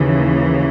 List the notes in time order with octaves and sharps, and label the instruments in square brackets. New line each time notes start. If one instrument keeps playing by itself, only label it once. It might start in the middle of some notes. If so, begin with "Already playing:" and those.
Already playing: [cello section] D#2 C#3 E3